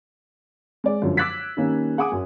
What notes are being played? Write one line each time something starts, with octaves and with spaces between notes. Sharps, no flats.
G#3 D5
F#2 D3 F3 F#3
D6 E6 F#6 G#6 A6 B6
D#3 G3 A#3 C#4
G#4 F#5 G#5 D6 D#6
F#2